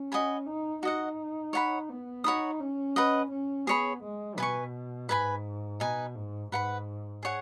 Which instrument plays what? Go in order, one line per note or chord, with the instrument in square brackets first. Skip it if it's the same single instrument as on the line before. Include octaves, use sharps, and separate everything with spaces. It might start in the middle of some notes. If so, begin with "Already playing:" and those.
Already playing: [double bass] C#4
[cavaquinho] F#4 D#5 G#5 B5
[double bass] D#4
[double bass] D#4 [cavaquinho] F#4 D#5 F#5
[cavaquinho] C#5 F#5 B5
[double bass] B3
[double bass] D#4 [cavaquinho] F#4 C#5 B5 D#6
[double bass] C#4
[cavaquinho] B4 D#5 F#5
[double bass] C#4
[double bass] B3 [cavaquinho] G#4 C#5 B5
[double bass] G#3
[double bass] B2 [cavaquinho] B4 G#5 C#6
[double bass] G#2 [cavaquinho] B4 G#5 B5
[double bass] B2 [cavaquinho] D#4 B4 G#5
[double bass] G#2
[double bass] G#2 [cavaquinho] B4 F#5 B5
[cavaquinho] G#4 C#5 F#5